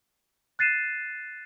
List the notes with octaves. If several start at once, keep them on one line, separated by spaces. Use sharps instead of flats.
F#6 A6 C7 D#7 E7